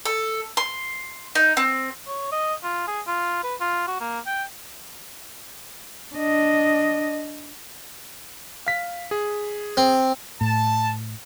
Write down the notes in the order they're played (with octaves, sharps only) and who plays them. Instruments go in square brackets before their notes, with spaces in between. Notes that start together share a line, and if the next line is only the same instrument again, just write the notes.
[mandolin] A4
C6
D#4
C4
[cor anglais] C#5
D#5
F4
G#4
F4
B4
F4
F#4
A#3
G5
[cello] D4 D#5
[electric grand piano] F5 B6
G#4
[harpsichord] C4
[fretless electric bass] A2 [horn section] A5